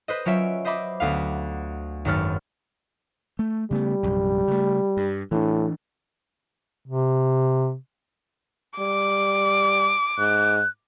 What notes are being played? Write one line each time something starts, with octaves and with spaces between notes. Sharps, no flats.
B4 C5 D#5
F#3 C#4 F4 E5 D7
C5 D#5 E5 B5 D6
D2 B3 F5
G#1 F#2 F#4 B4 F6 A6
A3
C#3 G3 A3 B3
A#1 F#2 C3
C#3 A3
G2
A2 E3 D4
C3
G3 D6
G#2 F#6